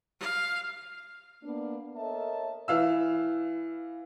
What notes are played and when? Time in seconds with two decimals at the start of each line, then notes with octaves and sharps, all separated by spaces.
0.20 F5
1.43 A#3 B3 D4
1.96 A4 A#4 C#5 D#5 E5 A5
2.68 E3 F5 E6